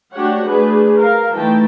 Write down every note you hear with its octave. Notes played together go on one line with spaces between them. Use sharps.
A3 D4 F#4 G4 C#5 F#5
A3 D4 G#4 B4
A#4 F5
E3 A3 D#4 G5 A5